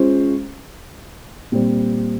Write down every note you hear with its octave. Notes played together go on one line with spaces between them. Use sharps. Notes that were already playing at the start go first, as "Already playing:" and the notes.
Already playing: G#3 C#4 F4 C5
A#2 G3 C4